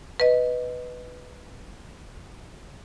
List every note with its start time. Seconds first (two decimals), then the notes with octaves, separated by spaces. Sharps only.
0.20 B4 D#5